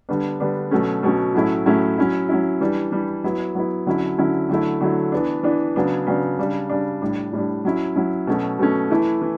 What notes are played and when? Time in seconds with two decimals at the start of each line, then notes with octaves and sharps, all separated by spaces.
0.09 D3 G3 B3 D4
0.40 D3 G3 B3 D4
0.71 B2 F#3 A3 C#4
1.03 B2 F#3 A3 C#4
1.35 A2 F#3 A3 C#4 E4
1.66 A2 F#3 A3 C#4 E4
1.98 F#3 C#4 E4
2.29 F#3 C#4 E4
2.61 E3 G3 D4
2.92 E3 G3 D4
3.24 F#3 B3 E4
3.55 F#3 B3 E4
3.86 D3 F#3 C#4 E4
4.18 D3 F#3 C#4 E4
4.49 D3 F#3 A3 E4
4.81 D3 F#3 A3 E4
5.12 E3 B3 D4
5.43 E3 B3 D4
5.76 C#3 F#3 B3 D4
6.07 C#3 F#3 B3 D4
6.39 C#3 G3 D4
6.69 C#3 G3 D4
7.01 A2 G3 D4
7.33 A2 G3 D4
7.65 F#3 C#4 E4
7.96 F#3 C#4 E4
8.27 B2 F#3 A3 C#4
8.59 B2 F#3 A3 C#4
8.90 E3 A3 E4
9.22 E3